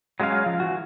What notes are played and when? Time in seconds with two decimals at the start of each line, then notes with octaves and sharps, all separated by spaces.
0.20 F#3 G#3 C#4 D4 F5
0.46 F3
0.60 E3 F#4